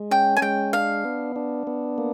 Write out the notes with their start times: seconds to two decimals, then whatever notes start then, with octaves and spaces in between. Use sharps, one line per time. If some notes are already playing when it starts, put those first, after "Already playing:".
Already playing: G#3
0.11 C#4 G5
0.37 G#5
0.42 G#3 G5
0.73 D4 F5
1.05 B3
1.36 D4
1.67 B3
1.98 A#3